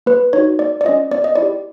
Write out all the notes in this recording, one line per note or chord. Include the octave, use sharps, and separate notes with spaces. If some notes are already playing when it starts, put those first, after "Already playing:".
A#3 B4
D#4 F#4 C#5
A#3 D5
D5
C#4 F4 D#5
B3 D5
D#5
E4 D5
G4